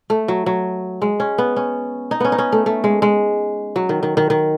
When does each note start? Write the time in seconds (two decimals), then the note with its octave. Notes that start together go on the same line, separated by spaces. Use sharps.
0.10 A3
0.28 F#3
0.46 F#3
1.02 G#3
1.20 C#4
1.38 B3
1.56 C#4
2.11 D#4
2.20 B3 C#4
2.32 D#4
2.38 C#4
2.52 A3
2.66 A3
2.84 G#3
3.02 G#3
3.76 F#3
3.89 D#3
4.03 D#3
4.17 D#3
4.30 D#3